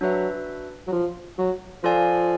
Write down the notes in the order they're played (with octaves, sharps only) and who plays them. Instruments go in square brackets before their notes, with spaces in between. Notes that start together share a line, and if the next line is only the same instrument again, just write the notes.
[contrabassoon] F#3 [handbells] D4 F#4 B4 E5
[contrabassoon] F#3
F3
F#3
[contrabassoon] F3 [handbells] F4 A4 D5 F5 G#5